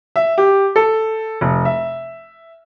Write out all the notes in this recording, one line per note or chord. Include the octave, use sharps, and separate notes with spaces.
E5
G4
A4
F1
E5